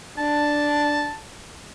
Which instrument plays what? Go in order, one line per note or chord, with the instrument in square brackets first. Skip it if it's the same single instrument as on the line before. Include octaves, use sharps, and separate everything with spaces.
[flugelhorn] D4 [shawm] A5